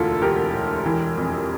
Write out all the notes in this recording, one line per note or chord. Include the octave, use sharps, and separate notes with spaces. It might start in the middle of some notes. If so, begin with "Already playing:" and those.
Already playing: E1 D2 E4 F4 A4
E1 G4 A#4
E1
E3
F2